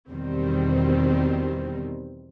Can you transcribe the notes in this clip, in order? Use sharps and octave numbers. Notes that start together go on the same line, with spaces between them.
E2 B2 D#3 G3 C4